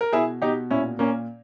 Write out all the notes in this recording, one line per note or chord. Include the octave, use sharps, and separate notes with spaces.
A#4
B2 E4 G#4
B2 D#4 G4
A#2 C#4 E4
A#2 A#3 C#4